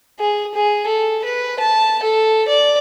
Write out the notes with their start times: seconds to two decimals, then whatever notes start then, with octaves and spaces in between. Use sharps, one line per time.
0.19 G#4
0.55 G#4
0.87 A4
1.25 B4
1.60 A5
2.03 A4
2.48 D5